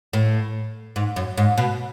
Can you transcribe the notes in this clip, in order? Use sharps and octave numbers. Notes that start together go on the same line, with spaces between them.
A2
G#2
F#2
G#2
B2